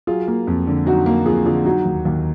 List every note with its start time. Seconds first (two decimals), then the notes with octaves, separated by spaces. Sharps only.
0.07 F#3 F4 G#4
0.28 A#3
0.47 F2
0.67 D3
0.86 F#3 D#4 F#4
1.06 A#3
1.26 F2 F4 G#4
1.46 D3 F4 G#4
1.65 F#3 D#4 F#4
1.86 D#2
2.05 D#2